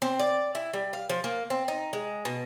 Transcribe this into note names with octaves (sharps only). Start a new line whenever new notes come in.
C4
D5
E4
G3
F5
F3
A#3
C4
D#4
G#3
B2